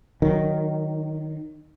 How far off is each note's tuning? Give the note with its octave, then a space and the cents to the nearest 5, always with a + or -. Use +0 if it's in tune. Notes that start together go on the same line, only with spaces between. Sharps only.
D#3 -10 F#3 +0